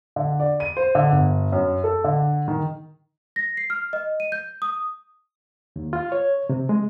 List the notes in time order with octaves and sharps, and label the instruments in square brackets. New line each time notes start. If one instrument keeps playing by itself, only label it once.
[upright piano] D3
D5
D#7
C5
D3
G1
F#2
A4
D3
D#3
[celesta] A#6
C7
F6
D#5
D#7
G6
D#6
[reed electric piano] D#2
F4
C#5
C3
G#3